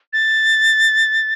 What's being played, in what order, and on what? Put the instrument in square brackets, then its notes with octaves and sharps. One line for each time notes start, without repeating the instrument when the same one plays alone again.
[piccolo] A6